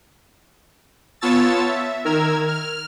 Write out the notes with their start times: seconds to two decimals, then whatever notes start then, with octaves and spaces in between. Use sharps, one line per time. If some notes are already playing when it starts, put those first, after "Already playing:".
1.21 B3 F4 C#5 A5 E6 A6
1.68 E5
2.05 D#3 A#4 E6 F6 G#6
2.48 F6